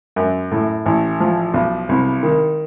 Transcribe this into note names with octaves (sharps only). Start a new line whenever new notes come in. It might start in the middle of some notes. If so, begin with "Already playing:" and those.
F#2
A2
A1
F3
B1
C2
D#3